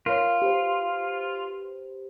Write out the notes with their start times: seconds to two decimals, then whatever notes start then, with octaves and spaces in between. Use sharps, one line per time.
0.06 F4 A#4 C#5
0.42 G4 B4 C5